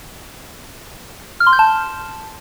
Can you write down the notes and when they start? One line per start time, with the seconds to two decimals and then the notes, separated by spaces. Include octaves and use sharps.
1.40 F6
1.47 C6
1.53 G6
1.59 A5